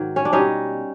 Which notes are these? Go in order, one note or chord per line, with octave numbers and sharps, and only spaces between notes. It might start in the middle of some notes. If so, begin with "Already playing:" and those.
Already playing: G#2 D#3 F#3
C#4
D4
B2 G3 C#4 D#4